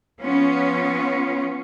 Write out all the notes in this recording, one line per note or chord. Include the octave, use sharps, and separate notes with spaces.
F3 B3 C#4 F4